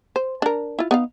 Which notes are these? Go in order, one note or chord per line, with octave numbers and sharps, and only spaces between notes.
C5
D4 A#4
E4 F4
B3 D#4 F5